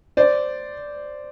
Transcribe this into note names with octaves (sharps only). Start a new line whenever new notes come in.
C5 D5